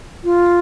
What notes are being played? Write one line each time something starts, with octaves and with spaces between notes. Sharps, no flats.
F4